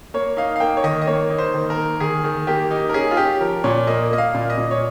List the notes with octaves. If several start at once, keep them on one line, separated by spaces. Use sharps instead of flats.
A#3 C#5
D#4 F5
F5
A#3 G5
C#5
D#3 D#5
D#5
A#3 C#5
D#4
C5
D#3
A#4
A#3
D#3 G#4
D#3
A#3 G4
D#4
A#4
C#4 G#4
F4
C#4 G4
F3 A#4
A#2 C#5
A#3 D#5
A#3 D#5
F5
A#2
D#5
A#2
C#5